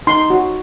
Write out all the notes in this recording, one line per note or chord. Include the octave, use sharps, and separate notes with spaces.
D#4 C6
F#4